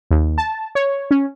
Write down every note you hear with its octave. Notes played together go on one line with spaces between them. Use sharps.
D#2
A5
C#5
C#4